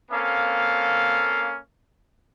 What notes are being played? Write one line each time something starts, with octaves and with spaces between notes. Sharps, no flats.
A#3 C4 C#4 A4 F5